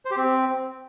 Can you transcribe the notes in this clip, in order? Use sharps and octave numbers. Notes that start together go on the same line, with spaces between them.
C5
G4
C4